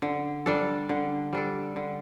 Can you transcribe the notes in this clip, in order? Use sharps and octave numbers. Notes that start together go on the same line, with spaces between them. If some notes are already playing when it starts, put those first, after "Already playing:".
D3
G3 D4 A4
D3
G3 D4 A4
D3